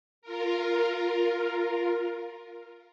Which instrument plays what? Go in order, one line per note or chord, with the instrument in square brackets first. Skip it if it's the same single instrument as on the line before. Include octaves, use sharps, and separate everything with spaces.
[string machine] F4 A#4